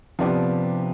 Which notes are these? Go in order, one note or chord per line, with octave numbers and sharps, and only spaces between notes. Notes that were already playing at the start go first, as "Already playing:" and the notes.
C3 F3 B3 D4 G4